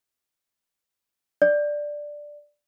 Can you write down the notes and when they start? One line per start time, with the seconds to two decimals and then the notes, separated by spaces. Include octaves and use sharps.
1.42 D5